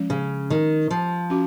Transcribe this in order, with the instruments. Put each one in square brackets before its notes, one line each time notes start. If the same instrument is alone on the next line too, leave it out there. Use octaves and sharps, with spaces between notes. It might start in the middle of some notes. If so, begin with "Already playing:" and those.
Already playing: [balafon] F3 G#3 C#4
[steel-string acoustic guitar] C#3
D#3
F3
[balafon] C#4 F#4